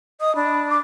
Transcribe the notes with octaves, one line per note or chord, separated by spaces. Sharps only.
D#5 D#6
D4 B5
D6